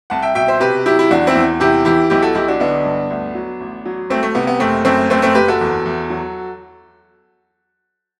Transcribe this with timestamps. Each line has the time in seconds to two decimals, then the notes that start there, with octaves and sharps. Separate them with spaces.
0.10 C2 F#5 A5
0.22 E5 G5
0.35 B2 E5 G5
0.48 C5 E5
0.60 C3 G4 B4
0.86 F#3 E4 G4
0.99 E4
1.11 E2 D4 F#4
1.27 C4 E4
1.35 E2
1.60 C3 E4 G4
1.85 E3 E4 G4
2.10 B1 E4 G4
2.22 F#4 A4
2.35 B1 E4 G4
2.48 D4 F#4
2.60 D3 B3 D4
2.85 G2
3.10 D2
3.35 F#3
3.61 A1
3.85 F#3
4.10 C2 A3 C4
4.23 A3
4.35 C3 B3
4.47 B3
4.60 F#1 A3 C4
4.85 F#2 A3 C4
5.10 F#1 A3 C4
5.22 A3 C4
5.35 F#1 G4 B4
5.48 F#4 A4
5.61 E2
5.86 E2
6.10 F#3